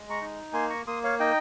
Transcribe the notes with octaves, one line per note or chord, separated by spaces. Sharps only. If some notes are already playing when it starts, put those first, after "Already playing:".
Already playing: G#3
A#5 C#6
D#4
A#3 G#5 C6
A#5 C#6
A#3 C6 D#6
C#5 F5
D#4 D#5 G5